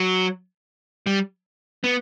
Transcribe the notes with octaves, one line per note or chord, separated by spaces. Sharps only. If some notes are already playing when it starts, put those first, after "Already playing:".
Already playing: F#3
G3
B3